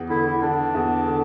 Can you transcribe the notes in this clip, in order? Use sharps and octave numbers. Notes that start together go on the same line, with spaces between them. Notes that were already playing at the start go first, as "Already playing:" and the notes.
Already playing: E2
D3 E4
E4
D3 D4
E2
D3